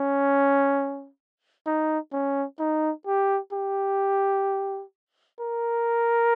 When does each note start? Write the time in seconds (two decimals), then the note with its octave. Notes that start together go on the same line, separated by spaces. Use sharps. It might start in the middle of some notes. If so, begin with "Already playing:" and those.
Already playing: C#4
1.66 D#4
2.12 C#4
2.59 D#4
3.07 G4
3.53 G4
5.40 A#4